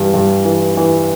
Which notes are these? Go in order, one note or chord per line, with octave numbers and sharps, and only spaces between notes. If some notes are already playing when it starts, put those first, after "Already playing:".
Already playing: G2 E3
G2
E3
E3